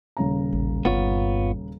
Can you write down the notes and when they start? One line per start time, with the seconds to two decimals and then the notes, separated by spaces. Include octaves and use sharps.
0.17 D#1 C#3 A#5
0.53 A1
0.85 G1 G2 B3 F4 C#5